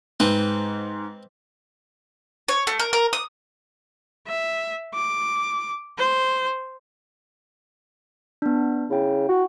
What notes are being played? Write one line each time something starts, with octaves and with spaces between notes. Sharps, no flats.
G#2 C4 B4
C#5
A3
A#4
A#4
D#6
E5
D6
C5
B3 D4
C#3 E4 G5
F#4